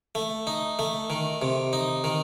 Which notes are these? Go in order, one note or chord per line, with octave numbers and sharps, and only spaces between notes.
A3
D#4
A3
D#3
C3
D#4
D#3